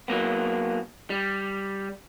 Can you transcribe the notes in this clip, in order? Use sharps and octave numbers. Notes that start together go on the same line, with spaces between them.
F#3 A#3 B3
G3